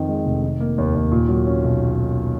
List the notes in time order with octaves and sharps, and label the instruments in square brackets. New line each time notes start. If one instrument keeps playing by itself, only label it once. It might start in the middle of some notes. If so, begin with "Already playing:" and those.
Already playing: [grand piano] F2 D#3
G#3
F1
D#3
A#3
D#2
D#2
A#2
F#3
C#4
B1